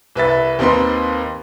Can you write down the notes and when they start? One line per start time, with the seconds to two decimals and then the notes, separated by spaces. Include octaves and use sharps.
0.15 C2 B4 E5 A6
0.59 D#2 C4 D#4 B4 C6